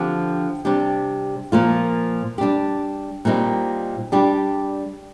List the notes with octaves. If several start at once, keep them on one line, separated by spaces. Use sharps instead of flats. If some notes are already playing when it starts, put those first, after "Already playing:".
Already playing: D3 F3 C4 G4
C3 G3 D4 G4
A#2 F3 A#3 F4
G3 D4 G4
A#2 G3 C4 D#4
G3 D4 G4